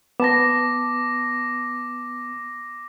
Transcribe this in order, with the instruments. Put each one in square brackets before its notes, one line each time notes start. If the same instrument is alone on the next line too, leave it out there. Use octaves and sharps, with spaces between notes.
[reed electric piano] B3 A5 [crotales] D6 A#6